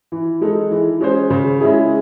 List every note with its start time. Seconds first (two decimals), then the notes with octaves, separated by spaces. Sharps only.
0.12 E3
0.41 G#3 D#4 A4
0.71 E3
1.00 G#3 C#4 G#4 C5
1.30 C#3
1.60 G#3 C#4 E4 G#4